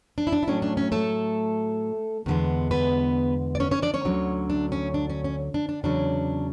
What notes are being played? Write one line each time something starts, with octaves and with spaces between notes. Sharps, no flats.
D4
E4
D4
E4
A2 F#3 A3 C#4 D4
D4
C#4
A3 A4
E2 D3 G#3 B3
B3 B4
D5
C#4 C#5
C#4 C#5
D4 D5
C#4 C#5
D2 D3 F#3 C#4
D4
C#4
D4
C#4
C#4
D4
D4
E2 C#3 F#3 C#4 D4